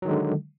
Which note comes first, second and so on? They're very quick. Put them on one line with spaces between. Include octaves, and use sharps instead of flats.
F#3 D#3 G#3 D3